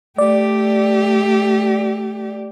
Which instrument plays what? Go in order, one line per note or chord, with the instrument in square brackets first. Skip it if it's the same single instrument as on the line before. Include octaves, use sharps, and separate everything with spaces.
[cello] A3 G4 [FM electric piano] D5